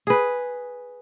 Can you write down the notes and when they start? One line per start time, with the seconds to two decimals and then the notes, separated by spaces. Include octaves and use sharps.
0.07 G#4 B4